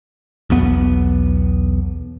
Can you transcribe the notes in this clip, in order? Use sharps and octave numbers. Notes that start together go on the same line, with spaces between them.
B1 E2 B3